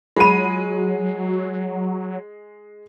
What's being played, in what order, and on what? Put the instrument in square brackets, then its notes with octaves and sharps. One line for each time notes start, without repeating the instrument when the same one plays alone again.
[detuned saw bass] F#3 [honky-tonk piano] G#3 D#7 [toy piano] F4 B5